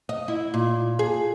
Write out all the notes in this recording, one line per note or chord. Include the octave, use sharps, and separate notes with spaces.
D#5
E4
A#2
G#4